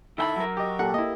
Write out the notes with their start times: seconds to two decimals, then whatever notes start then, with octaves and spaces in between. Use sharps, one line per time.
0.18 D#3 E4 A4 E5 G5 B5
0.36 F#3 A#4
0.57 F#4 G4 D#5
0.79 A#2 G4 A4 F#5
0.94 A#3 E4 D#5